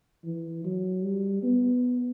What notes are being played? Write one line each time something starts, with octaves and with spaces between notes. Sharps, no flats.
E3
F#3
G3
B3